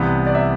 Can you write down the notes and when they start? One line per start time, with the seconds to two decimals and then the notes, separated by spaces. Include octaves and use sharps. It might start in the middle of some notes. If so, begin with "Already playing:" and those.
Already playing: C2 C3 E3 B3
0.27 D5
0.35 E5